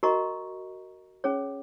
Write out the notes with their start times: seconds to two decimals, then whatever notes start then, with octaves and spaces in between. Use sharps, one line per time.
0.03 F#4 A#4 D#5 A#5 C#6
1.24 C#4 G#4 C#5